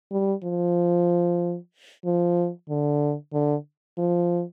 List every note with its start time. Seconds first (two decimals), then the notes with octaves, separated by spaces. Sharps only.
0.11 G3
0.44 F3
2.05 F3
2.69 D3
3.33 D3
3.98 F3